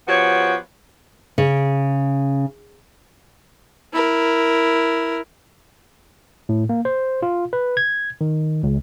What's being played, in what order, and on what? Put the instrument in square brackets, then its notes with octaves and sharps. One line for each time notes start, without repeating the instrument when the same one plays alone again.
[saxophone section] F3 B3 F#4 G4 C#5
[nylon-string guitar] C#3
[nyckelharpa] E4 A#4
[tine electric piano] A2
A#3
C5
F4
B4
G#6
D#3
C#2